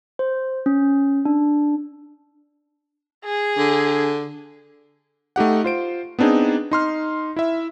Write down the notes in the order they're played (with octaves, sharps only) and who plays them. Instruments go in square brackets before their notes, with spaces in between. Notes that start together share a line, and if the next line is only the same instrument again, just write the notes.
[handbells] C5
C#4
D4
[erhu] G#4
[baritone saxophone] D3
[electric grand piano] A3 D#4 G4 F#5
F4 C5 D7
B3 C4 D4 D#4 G#4
D#4 C6 F6
E4 E5